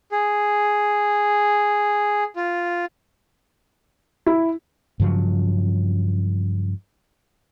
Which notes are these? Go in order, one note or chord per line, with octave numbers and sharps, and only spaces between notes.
G#4
F4
E4
G2 C#3 F3 F#3